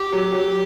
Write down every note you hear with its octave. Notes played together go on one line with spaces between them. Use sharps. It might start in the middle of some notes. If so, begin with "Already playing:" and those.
Already playing: G4
F#3
F#3